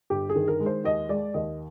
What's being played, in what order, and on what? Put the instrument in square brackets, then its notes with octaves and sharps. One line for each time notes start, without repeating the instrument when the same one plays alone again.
[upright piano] G1 G4
G#4
D#3
A#4
G#3
C5
D#2 D#5
G#3 D5
D#2 D#5